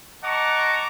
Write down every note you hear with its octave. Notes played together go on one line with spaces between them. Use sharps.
D#5 F#5 A5 A#5 C#6 D6